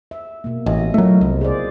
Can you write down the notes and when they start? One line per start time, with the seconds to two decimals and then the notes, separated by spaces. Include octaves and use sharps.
0.11 E5
0.44 B2 A#3
0.66 A1 D#5
0.94 F#3 A3 E4 F4 A#4
1.21 C2
1.41 G#4 C5 D5